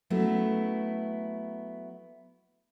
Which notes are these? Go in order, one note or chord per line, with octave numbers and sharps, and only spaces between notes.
F#3 A3 B3 C#4 E4